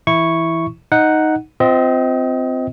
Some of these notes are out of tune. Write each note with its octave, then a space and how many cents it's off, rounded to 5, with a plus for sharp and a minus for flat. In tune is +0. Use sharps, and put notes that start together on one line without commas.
E3 +0 E4 +0 C#6 +0
D#4 +0 F#5 +0
C4 -15 F4 +0 D#5 +25